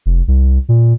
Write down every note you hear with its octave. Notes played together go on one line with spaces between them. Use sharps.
F1
C2
A#2